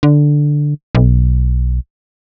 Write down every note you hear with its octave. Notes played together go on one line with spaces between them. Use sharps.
D3
B1